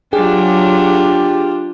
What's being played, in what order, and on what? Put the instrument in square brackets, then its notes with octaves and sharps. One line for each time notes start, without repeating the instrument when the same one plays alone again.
[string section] F#3 [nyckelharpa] D4 F4 [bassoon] G4 [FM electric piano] G#4